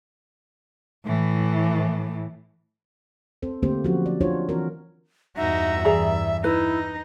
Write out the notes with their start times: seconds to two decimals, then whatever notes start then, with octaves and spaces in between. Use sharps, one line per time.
1.06 A2 E3
3.42 C4 A4 C5
3.62 D3 A3 A#3 C4 G4 C5
3.84 F3 F#3 C#4 F#4 G4
4.06 D5
4.21 D4 F4 F#4 C5 C#5
4.49 E3 C4 F#4 A#4
5.37 E2 G2 D#4 F#4 E5
5.85 E3 G#4 D5 A#5
6.44 D#4 E4 B4